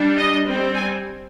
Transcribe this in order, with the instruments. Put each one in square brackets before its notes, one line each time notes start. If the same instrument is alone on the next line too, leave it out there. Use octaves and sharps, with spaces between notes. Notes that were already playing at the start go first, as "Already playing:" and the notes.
Already playing: [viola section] G3 D4
D#5
G3 C4
G#5